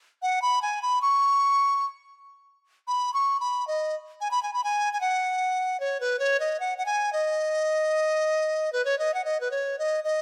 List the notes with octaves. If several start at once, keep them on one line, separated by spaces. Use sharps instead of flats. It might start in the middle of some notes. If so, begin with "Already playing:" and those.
F#5
B5
G#5
B5
C#6
B5
C#6
B5
D#5
G#5
B5
G#5
B5
G#5
G#5
F#5
C#5
B4
C#5
D#5
F#5
F#5
G#5
D#5
B4
C#5
D#5
F#5
D#5
B4
C#5
D#5
D#5